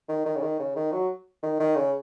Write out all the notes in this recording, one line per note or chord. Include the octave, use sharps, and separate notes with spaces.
D#3
D#3
C#3
D#3
C#3
D#3
F#3
D#3
D#3
C#3